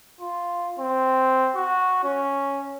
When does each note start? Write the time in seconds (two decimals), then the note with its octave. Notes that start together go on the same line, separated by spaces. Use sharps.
0.20 F4
0.79 C4
1.55 F#4
2.04 C#4